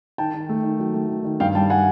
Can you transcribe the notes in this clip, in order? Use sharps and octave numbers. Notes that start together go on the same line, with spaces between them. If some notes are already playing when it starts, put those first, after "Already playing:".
D#3 G5 A5
D#3
A3
D#3
F#3
A3
D#3
D#3
G2 F5 G5
G3 G5 A5
F#5 G#5